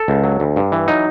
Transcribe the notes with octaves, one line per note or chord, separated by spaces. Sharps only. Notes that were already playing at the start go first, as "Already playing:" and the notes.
Already playing: A4
C#2
F#3
D2
G2
E3
F#3 D#4